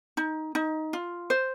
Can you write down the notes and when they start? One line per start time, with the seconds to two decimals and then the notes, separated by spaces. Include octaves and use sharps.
0.17 D#4
0.55 D#4
0.93 F4
1.30 C5